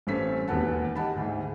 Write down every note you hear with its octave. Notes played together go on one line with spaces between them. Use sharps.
A1 G2 C4 C#4 A4 B6
E1 D#2 B3 A4 F#5 A5
G4 D#5 F#5 A5 B5
D2 G#2